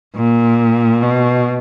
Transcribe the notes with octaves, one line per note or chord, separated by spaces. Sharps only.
A#2
B2